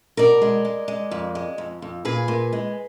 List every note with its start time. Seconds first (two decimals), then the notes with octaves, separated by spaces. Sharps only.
0.17 B2 A#4 D5
0.42 G#3
0.65 G#3
0.88 G#3
1.11 F2
1.35 G#3
1.58 F2
1.82 F2
2.05 A#2 G#4 B4
2.28 A#2
2.53 G#3